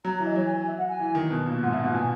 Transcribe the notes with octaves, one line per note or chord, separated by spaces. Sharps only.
F#3 A#5
A#5
E3
D#5
F#3 C#5
G#5
G#5
E5
F#5
G#5
E3
D#3
B2
A#2
G#2 F#5
A#2 E5
B2 F#5
B2 G#5